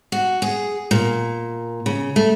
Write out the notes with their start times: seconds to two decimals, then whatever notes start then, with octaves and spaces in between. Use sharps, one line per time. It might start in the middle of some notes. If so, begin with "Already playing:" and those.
0.12 F#4
0.42 G#4
0.91 A#2
1.86 C#3
2.16 A3